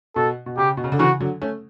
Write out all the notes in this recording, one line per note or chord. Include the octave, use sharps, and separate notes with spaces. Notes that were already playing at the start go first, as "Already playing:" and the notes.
B2 A4
B2
C#3 G4
B2
C#3
D3
C#3 E3 F#4
D3 F#3
A3 C#4